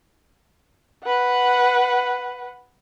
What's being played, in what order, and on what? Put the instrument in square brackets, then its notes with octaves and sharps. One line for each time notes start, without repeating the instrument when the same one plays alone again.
[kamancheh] B4 F#5